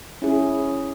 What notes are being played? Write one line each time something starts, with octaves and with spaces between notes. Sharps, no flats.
C#4 E4 G#4